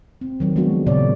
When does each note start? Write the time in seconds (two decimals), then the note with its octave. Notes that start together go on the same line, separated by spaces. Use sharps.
0.21 C4
0.40 D#3 F#3
0.56 F3 G#3 B3 D4 F#4
0.86 A#2 C#3 C#5 D5